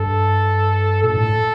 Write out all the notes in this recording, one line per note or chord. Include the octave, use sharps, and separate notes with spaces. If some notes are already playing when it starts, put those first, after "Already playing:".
Already playing: G2 A4
A#2 A4
A2